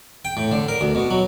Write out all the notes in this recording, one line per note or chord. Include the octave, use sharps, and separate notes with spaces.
G5
A2
D3
A#4
D2
B2
F#3